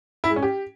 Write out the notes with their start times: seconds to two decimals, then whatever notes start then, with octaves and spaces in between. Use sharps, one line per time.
0.24 E4
0.30 G#3
0.36 C#4
0.43 G4